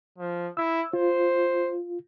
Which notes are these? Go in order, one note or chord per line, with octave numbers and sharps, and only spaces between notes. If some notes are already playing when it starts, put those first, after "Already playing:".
F3
E4 E6
F4 C5